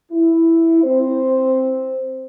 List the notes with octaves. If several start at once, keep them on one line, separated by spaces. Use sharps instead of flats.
E4
C4 C5